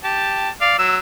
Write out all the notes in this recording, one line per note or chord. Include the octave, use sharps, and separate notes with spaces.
G4 A5
D5 F5
F#3 E6